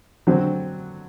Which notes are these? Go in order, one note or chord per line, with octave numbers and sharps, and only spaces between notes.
D3 F#3 C4